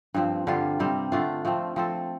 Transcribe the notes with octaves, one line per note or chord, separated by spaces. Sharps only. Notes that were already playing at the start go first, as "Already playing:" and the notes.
G2 F3 C4
G2 D3 G3 F4
C3 G3 C4
D3 A3 D4 F4
F3 A3 C4
F3 C4 A4